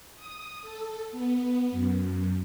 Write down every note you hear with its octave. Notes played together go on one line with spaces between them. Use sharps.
D#6
A4
B3
F#2